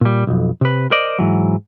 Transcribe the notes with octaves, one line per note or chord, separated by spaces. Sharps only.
A#2 G3
B1 F2
C3 B4
A#4 C5 D5 D#5
G#2 E3 F#3